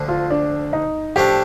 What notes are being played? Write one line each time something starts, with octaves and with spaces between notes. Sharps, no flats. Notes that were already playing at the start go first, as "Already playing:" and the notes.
Already playing: D2 D3 F3
F4
D4
D#4
A2 F3 A3 D4 G4